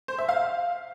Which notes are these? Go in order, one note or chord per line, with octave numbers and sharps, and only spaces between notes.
C5
E5
F5